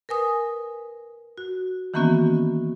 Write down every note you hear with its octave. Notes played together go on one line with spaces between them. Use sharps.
A#4 B4 G#5 D#6
F#4
D#3 E3 A#3 B3 C#4 F#4